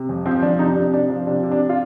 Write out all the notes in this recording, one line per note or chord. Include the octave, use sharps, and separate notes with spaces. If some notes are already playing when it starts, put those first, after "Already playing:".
Already playing: C3
F2
F3 C4
F2 D4
C3 D#4
C3 D4
C3 D4
F3
C3 D4
C3
D4
F4